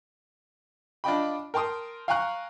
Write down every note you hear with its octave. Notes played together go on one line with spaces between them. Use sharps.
D4 F4 D#5 G5 B5
A#4 G5 A5 C6 D#6
F5 G5 G#5 A#5 C#6 F#6